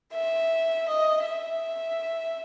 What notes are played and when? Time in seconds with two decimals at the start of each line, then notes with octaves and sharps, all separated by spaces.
0.13 E5
0.88 D#5
1.26 E5